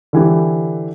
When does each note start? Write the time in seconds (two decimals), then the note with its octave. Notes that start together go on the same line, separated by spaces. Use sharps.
0.13 D3 E3 G4